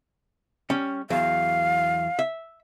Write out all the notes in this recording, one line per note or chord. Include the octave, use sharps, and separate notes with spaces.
G3 C#4
E2 F#3 F5
E5